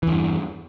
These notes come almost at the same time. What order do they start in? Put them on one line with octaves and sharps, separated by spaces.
E3 E2 G2